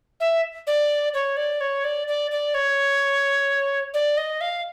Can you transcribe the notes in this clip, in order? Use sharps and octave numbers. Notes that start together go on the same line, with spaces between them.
E5
D5
C#5
D5
C#5
D5
D5
D5
C#5
D5
D#5
F5